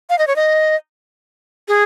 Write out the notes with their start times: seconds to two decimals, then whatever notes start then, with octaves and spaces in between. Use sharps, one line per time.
0.10 F5
0.19 D#5
0.27 C#5
0.36 D#5
1.68 G#4